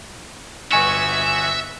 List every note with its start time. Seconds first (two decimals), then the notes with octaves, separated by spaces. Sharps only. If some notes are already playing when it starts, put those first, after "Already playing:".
0.72 G1 F#4 B4 D#5 E5 G#5 C#6 C#7